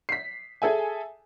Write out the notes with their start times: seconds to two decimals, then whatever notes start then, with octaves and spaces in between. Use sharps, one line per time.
0.09 B6 C7
0.62 G#4 A4 E5 G#5